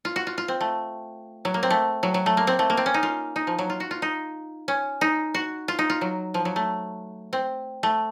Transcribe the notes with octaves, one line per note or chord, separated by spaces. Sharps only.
F4
F#4
F4
F4
C4
A3
F#3
A#3
C4
A3
F#3
F#3
A3
A#3
C4
A3
A#3
C4
C#4
D#4
F4
D#4
F3
F#3
F4
F#4
F4
D#4
C#4
D#4
F#4
F4
D#4
F4
F#3
F3
F#3
A3
C4
A3